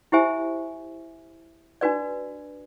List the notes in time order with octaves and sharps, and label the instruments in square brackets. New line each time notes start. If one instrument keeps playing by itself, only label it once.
[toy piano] E4 G4 C5 E5 G#5
D4 F#4 B4 D5